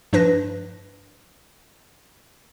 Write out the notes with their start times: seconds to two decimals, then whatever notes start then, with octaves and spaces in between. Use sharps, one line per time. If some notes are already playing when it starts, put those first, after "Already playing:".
0.13 G2 F3 D4 B4 A#6